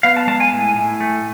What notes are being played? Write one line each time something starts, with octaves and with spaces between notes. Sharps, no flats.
B3 F5
A5
G#3 A5
G#5
A2
A2
A3